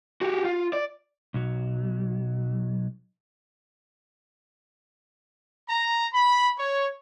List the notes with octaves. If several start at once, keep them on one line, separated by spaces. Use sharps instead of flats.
F#4 G4
F4
D5
B1 F#3
A#5
B5
C#5